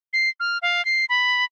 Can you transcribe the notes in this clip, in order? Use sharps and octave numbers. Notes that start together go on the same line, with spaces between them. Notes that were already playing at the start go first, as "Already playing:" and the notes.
C7
F6
F5
C7
B5